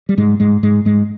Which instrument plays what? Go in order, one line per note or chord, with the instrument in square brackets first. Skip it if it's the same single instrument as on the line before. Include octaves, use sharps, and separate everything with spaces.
[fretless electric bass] G3
G#2 G#3
G#2 G#3
G#2 G#3
G#2 G#3